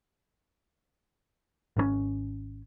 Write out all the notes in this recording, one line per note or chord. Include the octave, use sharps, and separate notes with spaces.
G#1 C3 C#4